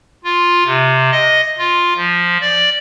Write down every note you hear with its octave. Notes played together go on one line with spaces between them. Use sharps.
F4
C3
D#5
F4
F3
D5